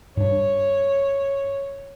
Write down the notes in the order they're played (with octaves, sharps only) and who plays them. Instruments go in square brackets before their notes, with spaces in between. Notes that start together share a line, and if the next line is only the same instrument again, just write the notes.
[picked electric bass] G2 D4 [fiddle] C#5